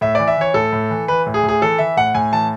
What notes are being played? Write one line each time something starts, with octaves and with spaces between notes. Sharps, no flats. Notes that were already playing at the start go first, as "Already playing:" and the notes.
A2 E5
E3 D5
E5
E3 C#5
A2 A4
A2
E3
E3 B4
A2
G#4
A2
G#4
E3 A4
E3 E5
A2 F#5
A2 G#5
E3 A5